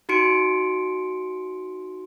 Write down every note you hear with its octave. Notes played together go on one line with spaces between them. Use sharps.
D#4 F#4 C6 C#7 D7